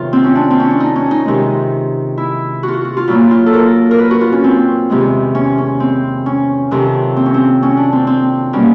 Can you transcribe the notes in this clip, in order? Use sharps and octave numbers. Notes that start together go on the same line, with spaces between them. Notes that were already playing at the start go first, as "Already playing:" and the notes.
Already playing: E2 C3 D#3 F#3 F4
C4
C#4
D4
C4
C#4
D4
D#4
C#4
D#4
C3 D#3 G#3
E4
F#4
F4
F#4
F#4
F4
A#2 F#3 A#3 E4
E4
F4
A4
A#4
A#4
B4
F#4
F4
C#4
C4
E2 C3 D#3 G#3
C#4
C#4
C4
C#4
F2 C3 D#3 F#3
C4
C#4
C4
C#4
D4
C4
C4
B2 G3 A#3 C#4